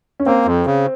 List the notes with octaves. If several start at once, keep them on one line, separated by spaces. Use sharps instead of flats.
C#4
A#3 C4
F2
C#3